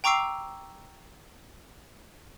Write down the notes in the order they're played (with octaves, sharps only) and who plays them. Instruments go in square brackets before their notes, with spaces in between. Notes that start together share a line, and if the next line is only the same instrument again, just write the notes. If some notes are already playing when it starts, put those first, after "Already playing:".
[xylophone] G5 A#5 C#6 D6 E6 C7